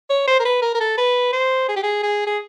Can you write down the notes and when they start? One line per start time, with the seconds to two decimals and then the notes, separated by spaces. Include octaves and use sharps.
0.10 C#5
0.28 C5
0.40 A#4
0.45 B4
0.62 A#4
0.75 A#4
0.80 A4
0.98 B4
1.33 C5
1.69 G#4
1.76 G4
1.83 G#4
2.03 G#4
2.27 G#4